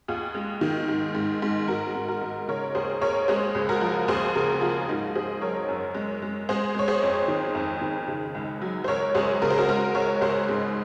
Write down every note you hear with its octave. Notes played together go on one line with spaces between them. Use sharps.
D#2 F4 G#4
G#3
D#3
G#2
G#2
G#2
G#2 F#4 A#4
G#2
F#4 A#4
G#2
C#3 A#4 C#5
D#2 G#4 C5
D#2 A#4 C#5
G#3 G#4 C5
C#2
F#4 A#4
F3
D#2 G#4 C5
C#3 F#4 A#4
F3 F4 G#4
G#2 D#4 F#4
G#2 G#4 C5
F#3 A#4 C#5
F#2
G#3
G#3
G#3 G#4 C5
G#3 C#5
G#4 C5
F2
D#3
F2
D#3
C#3
C#2
F#3
C5
C#2 A#4 C#5
C#2 G#4 C5
C#3 A#4
C5
F#4 A#4
G#3 F#4 A#4
C#2 A#4 C#5
C#2 G#4 C5
G#2